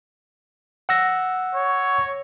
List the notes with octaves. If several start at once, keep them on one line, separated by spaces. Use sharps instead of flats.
F#5 E6 A#6
C#5